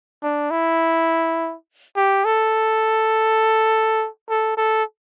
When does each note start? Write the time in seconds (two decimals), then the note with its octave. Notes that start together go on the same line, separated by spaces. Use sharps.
0.23 D4
0.50 E4
1.96 G4
2.25 A4
4.29 A4
4.57 A4